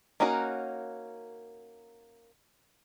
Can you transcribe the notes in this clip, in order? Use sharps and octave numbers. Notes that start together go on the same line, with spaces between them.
A#3 C#4 D#4 F#4 A#4